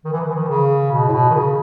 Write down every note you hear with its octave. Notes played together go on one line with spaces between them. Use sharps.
D#3
E3
D#3
E3
D#3
C#3
B2
A2
B2
D#3
C#3